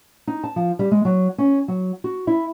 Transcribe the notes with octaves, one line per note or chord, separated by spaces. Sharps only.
D#4
A5
F3
G3
G#3
F#3
C#4
F#3
F#4
E4